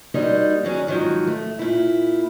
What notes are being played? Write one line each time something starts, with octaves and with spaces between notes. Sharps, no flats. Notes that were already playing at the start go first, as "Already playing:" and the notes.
G3 A#3 D#4 F#4 C5 C#5
D#3 F#3 C#4 G#4
G#2 D#3 F3 F#3
A3
A#2 E4